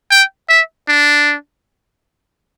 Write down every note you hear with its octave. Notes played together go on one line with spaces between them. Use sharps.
G5
E5
D4